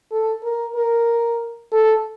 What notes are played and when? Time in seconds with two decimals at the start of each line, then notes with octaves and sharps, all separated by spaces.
0.11 A4
0.43 A#4
0.75 A#4
1.72 A4